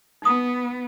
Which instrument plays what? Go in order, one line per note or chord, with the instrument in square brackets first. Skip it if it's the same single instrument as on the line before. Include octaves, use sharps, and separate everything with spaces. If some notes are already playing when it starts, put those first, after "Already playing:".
[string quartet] B3 [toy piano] D#4 D#6